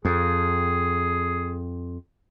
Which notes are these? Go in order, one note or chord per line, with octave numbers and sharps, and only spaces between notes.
F2 G#4